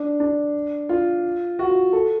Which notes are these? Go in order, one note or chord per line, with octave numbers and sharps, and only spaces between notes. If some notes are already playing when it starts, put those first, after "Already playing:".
Already playing: D4
D4
F4
F#4
F4
A4